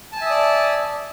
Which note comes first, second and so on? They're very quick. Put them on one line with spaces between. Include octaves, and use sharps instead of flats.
A5 G#5 E5 D#6 D5